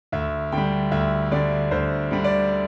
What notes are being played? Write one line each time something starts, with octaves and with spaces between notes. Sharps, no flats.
D2 E5
D3 G3 G5
D2 E5
D3 G3 D5
D2 C5
D3 G3
D5